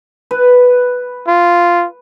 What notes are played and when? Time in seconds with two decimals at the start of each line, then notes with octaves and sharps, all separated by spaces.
0.31 B4
1.27 F4